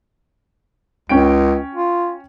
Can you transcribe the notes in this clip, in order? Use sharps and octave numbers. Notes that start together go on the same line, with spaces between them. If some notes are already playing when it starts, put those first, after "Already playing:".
C#2 C#4 G5 D7
F4